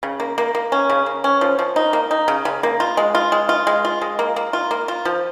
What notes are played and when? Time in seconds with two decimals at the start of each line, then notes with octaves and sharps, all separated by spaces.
0.03 C#3
0.20 A#3
0.38 A#3
0.55 A#3
0.72 C#4
0.90 C#3
1.06 A#3
1.24 C#4
1.41 F3
1.59 F3
1.76 D#4
1.93 A#3
2.11 D#4
2.28 C#3
2.45 C#3
2.63 A#3
2.80 F4
2.97 G#3
3.15 F4
3.32 G#3
3.49 F4
3.67 G#3
3.85 F4
4.01 G#3
4.19 A#3
4.36 A#3
4.53 F4
4.71 A#3
4.88 F4
5.05 F3